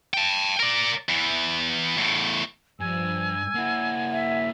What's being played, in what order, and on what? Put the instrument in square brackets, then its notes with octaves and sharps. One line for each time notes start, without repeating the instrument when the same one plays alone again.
[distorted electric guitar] G5 A5
A#4 D5
E2 E3
E2 A2
[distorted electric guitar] G2 [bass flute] F3 [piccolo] G#5 [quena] E6
[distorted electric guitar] A#3 E4 [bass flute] F#5
[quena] E5